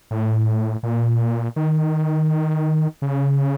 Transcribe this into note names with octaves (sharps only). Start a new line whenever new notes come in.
A2
A#2
D#3
C#3